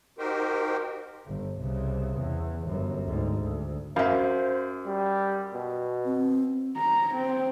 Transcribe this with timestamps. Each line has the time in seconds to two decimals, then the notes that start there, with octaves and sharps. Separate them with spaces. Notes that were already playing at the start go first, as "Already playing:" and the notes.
0.19 D#4 F#4 G4 A#4 C5 G5
1.27 G1
1.59 C2 C#3
2.18 E2
2.68 G1 F#2
3.06 D2 G#2
3.37 D2
3.96 F#2 C5 E5 F5
4.86 G3
5.53 B2
6.05 C4
6.77 A#5
7.15 C4